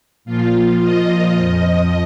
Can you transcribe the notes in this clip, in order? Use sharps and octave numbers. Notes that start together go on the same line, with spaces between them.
A#2 F3 F4
D#5
F2 F3 D#5